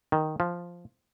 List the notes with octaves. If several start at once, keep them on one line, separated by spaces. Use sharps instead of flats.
D#3
F3